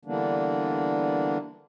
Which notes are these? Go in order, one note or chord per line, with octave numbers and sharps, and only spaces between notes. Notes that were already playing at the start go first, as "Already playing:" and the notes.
D3 E3 G3 A#3 B3 D4